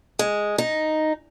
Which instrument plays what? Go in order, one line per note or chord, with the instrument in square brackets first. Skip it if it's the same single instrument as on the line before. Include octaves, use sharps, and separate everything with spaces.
[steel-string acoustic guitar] G#3
D#4